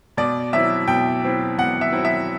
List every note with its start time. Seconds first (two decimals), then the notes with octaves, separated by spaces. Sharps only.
0.17 B2 D5
0.53 F#3 C4 E4 E5
0.88 B2 G5
1.23 F#3 C4 E4
1.58 B2 F#5
1.81 E5
1.93 F#3 C4 E4
2.05 E5